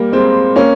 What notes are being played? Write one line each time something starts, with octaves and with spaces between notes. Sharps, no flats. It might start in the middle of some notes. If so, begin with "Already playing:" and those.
Already playing: G3 A#3
G#3 C4
A#3 C#4